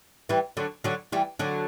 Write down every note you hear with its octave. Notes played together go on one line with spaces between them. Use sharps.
E3 G3
D3 F#3
D3 F#3
E3 G3
D3 F#3